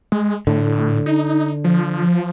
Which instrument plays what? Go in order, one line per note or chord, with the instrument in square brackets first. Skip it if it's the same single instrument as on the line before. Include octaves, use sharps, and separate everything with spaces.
[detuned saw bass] G#3
[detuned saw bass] A2 [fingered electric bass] D3
[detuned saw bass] D#4
F3